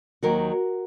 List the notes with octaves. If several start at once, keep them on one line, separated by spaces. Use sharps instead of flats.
D#2 D#3 F#3 F#4 A#4